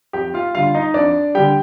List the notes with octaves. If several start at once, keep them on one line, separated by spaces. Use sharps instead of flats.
F2 G4 G5
F4 F5
D3 G3 F4 F5
D#4 D#5
F2 D4 D5
D3 G3 G4 G5